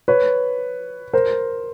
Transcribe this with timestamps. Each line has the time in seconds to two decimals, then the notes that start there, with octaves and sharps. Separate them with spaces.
0.08 B4 C#5
1.13 A#4 C5